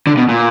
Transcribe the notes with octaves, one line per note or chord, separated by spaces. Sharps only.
D3
B2
A#2